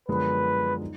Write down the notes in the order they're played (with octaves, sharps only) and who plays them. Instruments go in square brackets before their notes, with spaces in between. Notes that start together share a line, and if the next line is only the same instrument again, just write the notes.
[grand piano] F#2 D3 F3 G#3 B3 [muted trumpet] B4
[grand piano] D#4